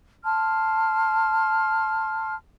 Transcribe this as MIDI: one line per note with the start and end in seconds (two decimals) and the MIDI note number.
0.25 2.36 81
0.25 2.36 84
0.25 2.36 89